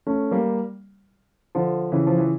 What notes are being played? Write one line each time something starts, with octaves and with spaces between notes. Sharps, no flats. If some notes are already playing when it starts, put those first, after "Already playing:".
A3 C#4
G3 A#3
D3 F3
C#3 E3
F3
E3